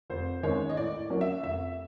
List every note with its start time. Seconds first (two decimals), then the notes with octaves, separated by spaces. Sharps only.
0.10 F1 C5
0.43 D#2 D#3 G#3 C#4 C#5
0.69 D#5
0.77 A2 D5
1.10 F#3 A#3 C#4
1.21 E5
1.43 F1 E5